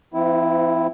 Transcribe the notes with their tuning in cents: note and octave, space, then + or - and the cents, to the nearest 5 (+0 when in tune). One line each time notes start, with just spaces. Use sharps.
F3 -45 C4 -30 E4 -5